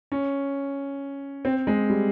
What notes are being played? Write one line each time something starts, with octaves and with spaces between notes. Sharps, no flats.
C#4
C4
G#3
G3